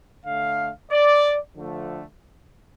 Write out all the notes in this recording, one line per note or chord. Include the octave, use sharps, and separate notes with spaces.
D3 A3 F5
D5
D3 F3 A3